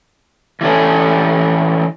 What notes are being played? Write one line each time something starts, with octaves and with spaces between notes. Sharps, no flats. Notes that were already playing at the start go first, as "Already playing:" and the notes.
E3 G3 C#4 A4 G#5